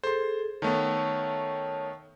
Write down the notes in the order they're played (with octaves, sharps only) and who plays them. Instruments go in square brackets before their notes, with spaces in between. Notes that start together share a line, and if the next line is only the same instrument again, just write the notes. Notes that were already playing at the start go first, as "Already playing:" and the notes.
[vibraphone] G#4 A4 [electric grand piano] C5 C6
[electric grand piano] D#3 A3 B3 [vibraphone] C#5 A5